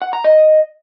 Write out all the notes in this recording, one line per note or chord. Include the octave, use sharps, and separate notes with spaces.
F#5
A#5
D#5